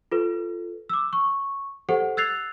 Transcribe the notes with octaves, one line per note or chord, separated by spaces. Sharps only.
F4 A4 B4
D6 E6
C#6
G4 A4 C5 F#5
E6 F#6 G#6 A6 C7 F7